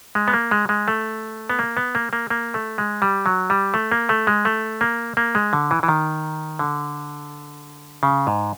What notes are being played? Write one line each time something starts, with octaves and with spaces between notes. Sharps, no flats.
G#3
B3
A#3
G#3
G#3
A3
B3
A#3
B3
A#3
A#3
A#3
A3
G#3
G3
F#3
G3
A3
A#3
A3
G#3
A3
A#3
A#3
G#3
D3
E3
E3
D#3
D3
C#3
G#2